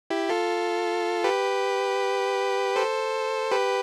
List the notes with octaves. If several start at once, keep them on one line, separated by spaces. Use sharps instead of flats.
E4 G4
F4 A4
G4 B4
A4 C5
G4 B4